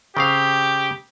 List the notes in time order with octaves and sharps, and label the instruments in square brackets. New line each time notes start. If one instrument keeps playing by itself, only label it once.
[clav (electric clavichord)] C#3 C4 F5 [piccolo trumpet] G4